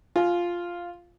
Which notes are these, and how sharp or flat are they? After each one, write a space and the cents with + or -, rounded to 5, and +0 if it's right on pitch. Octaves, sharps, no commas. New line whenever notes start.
F4 +0 G#5 +30